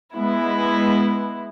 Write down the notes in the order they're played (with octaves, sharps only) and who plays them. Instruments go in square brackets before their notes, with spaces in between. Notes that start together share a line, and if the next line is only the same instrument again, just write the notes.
[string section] G#3 B3 E4